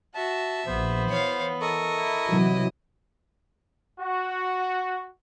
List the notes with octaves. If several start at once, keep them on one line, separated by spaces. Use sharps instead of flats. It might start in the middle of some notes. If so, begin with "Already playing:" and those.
F#4 E5 A5
A#1 B3 C5
E3 C#5 F5
A4 A#4 D#5 C#6
E4
C3 E3 F#3
F#4